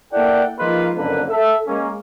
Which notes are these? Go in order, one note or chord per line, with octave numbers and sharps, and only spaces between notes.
A#3 E4 A4 D5 F#5 G5
F3 G#3 A#3 D#4 F4 B4
F#1 F2 D3 A#3 B4
A4 E5
G#3 A#3 C#4